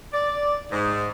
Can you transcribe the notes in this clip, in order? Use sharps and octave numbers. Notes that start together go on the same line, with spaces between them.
D5
G#2